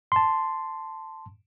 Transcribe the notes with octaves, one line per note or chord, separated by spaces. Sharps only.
A5 C6